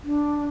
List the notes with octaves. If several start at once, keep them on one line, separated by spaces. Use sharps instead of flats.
D4